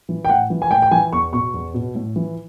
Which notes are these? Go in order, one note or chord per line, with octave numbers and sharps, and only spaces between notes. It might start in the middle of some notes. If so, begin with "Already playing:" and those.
E3
G5
A2 F#5
E3
G#5
A2 G5
G5
E3 G#5
E2 C#6
B2 C#6
E2
B2
A2
E3